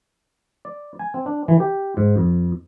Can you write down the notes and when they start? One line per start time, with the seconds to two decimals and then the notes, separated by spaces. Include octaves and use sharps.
0.65 D5
0.99 G#5
1.14 C4
1.26 D4
1.48 E3
1.60 G4
1.97 G#2
2.17 F2